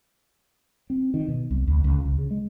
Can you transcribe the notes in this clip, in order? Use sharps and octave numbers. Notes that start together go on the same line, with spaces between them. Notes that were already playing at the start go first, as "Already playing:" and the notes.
C4
D#3
B2
C2
D2
C#2
C#2
C#3
G#3